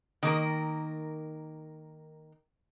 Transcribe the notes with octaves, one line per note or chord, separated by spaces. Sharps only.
D#3 A#3 A#4